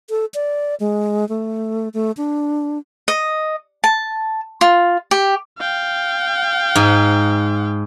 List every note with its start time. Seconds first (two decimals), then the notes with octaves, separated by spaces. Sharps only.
0.10 A4
0.34 D5
0.80 G#3
1.29 A3
1.94 A3
2.17 D4
3.08 D#5
3.84 A5
4.61 F4
5.11 G4
5.59 F5 G5
6.75 G#2